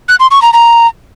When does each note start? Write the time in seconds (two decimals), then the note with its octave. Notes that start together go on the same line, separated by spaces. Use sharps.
0.08 F#6
0.20 C6
0.31 C#6
0.42 A#5
0.53 A#5